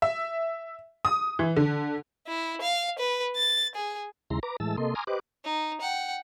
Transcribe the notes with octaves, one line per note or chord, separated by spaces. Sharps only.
E5
D#6
E3
D3
E4
F5
B4
A6
G#4
D#2 C#3 G#3 E4 A#5 C6
B4 A#5 D6
A2 E3 G#3 A5 E6
C3 A#3 A4 D#5 C6
G#5 A#5 C6 D6 D#6 F6
G4 B4 C5 D#5 D6 F#6
D#4
F#5 G5